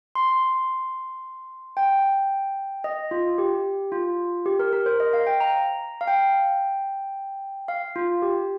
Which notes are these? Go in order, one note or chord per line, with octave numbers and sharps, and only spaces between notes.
C6
G5
D#5
F4
G4
F4
G4
A#4
A#4
C5
D#5
F5
G5
A#5
F5
G5
F5
F4
G4